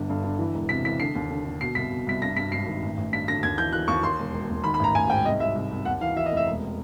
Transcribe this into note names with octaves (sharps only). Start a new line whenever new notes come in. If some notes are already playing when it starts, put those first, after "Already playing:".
Already playing: G1 D3
G2
D3
E3
E1
C3 B6
E3 B6
D3 C7
D#2
D3
D3
B2 C7
C2 B6
B2
C2 B6
G2 A#6
G2 B6
G#1 C7
D#3
A1
A1
G2 B6
D3 A#6
D#2 G#6
E3 G6
E3 F#6
D#2 C#6
D#2 C6
E1
E1
D#2
D#3 B5
B5
A1 A#5
A1 G#5
G#2 G5
C2 D#5
C2 E5
C2
C2
D#2 F#5
E3 F5
E3 E5
D#5
F1
E5
E1